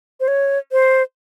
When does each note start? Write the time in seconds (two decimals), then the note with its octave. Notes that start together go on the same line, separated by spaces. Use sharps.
0.20 C5
0.28 C#5
0.72 C5